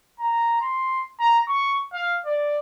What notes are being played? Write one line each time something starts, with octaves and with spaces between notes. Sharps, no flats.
A#5
C6
A#5
C#6
F5
D5